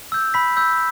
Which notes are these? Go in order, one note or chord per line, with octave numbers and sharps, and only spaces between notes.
E6 G6
B5 B6
E6 G6